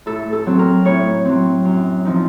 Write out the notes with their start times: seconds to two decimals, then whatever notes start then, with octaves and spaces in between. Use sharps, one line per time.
0.06 A2 A4
0.33 A4
0.46 F#3 C4
0.59 A#4
0.85 A2 C#5
1.25 F#3 C4
1.65 F#2
2.05 F3 C4 D#4